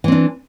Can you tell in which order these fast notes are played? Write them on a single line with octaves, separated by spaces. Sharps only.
E3 C4 D4